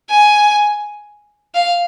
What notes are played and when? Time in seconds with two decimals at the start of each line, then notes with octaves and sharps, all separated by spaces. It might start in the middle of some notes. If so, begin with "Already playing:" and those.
0.10 G#5
1.54 F5